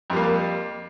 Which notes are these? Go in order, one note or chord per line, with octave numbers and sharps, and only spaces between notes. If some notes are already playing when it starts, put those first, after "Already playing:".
F2 G3 A#3